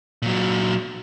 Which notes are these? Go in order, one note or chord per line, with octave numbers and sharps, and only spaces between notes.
A#2 F#3